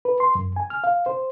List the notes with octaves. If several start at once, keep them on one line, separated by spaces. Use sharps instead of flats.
B4
C6
F#2
G#5
F6
F5
C5